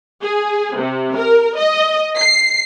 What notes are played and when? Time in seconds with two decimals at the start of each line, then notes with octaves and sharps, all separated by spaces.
0.22 G#4
0.76 C3
1.16 A#4
1.57 D#5
2.18 C7